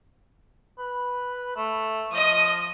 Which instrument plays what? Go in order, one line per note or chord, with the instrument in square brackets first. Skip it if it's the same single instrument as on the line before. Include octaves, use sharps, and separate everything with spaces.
[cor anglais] B4
A3
[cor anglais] F3 [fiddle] D#5 D#6